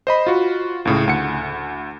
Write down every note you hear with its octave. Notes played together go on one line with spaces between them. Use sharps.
C5 D#5 B5
F4 F#4
C#2 A2 C#3
D2 F#5 C#7